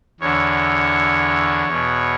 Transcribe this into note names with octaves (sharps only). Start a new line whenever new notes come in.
E2 D3 C#5
E2 B2